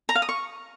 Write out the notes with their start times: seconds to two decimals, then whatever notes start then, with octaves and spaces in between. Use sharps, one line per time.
0.09 A#5
0.15 F5
0.22 D#6
0.29 C#6